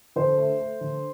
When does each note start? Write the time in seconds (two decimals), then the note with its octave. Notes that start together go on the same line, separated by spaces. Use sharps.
0.16 D3 C5
0.37 A3
0.59 A3
0.81 D3